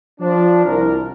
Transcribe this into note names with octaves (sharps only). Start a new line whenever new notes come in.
F3 D4
C2 A#4